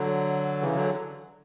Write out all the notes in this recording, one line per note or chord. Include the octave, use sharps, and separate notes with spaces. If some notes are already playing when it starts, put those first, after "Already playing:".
Already playing: D3 F#3
C#3 E3
D3 F#3